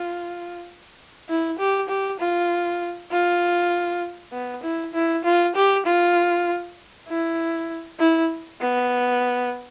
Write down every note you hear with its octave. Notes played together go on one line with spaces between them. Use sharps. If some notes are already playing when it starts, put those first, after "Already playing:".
Already playing: F4
E4
G4
G4
F4
F4
B3
E4
E4
F4
G4
F4
E4
E4
B3